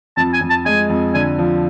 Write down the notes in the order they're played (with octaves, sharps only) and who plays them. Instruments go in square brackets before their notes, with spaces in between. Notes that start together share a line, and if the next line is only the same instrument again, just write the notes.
[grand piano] F2 [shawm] A5
[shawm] G#5
[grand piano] F2
[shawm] A5
[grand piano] G#3 [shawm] G#5
[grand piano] F2
[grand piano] D3 [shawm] G#5
[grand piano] F3